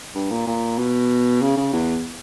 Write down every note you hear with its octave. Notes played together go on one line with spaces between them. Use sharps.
G2
A#2
A#2
B2
C#3
C#3
E2